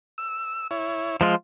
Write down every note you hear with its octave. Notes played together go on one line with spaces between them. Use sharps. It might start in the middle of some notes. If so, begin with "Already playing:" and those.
E6
E4 C#5
F3 G#3 F4